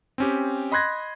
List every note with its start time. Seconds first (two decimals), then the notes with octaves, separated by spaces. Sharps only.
0.18 C4 C#4 G4
0.72 D#5 B5 C6 F#6 G#6 A#6